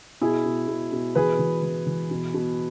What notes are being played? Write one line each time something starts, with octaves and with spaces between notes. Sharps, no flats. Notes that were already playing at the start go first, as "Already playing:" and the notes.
B2 E4 G#4
B2
B2
B2
E3 G#4 B4
E3
E3
E3
B2
B2